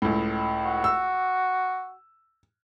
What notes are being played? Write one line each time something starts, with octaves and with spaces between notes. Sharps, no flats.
C#2 A2
F#4
E6